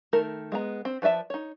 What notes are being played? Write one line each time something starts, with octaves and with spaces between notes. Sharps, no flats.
D#3 A3 A4 A#4
G#3 B3 A#5
C4
F3 B4 D5 E5 A5
D#4 C#5